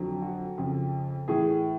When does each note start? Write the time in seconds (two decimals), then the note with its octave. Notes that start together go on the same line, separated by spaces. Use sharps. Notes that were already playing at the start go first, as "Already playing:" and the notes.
Already playing: F2 D3 F#3
0.22 F#4
0.58 F2 C#3 F3
1.28 A2 E3 G#4